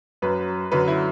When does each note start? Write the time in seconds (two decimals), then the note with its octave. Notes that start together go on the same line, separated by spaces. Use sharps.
0.22 F#2 F#3 B4
0.71 F#2 D3 F#3 B4
0.88 E4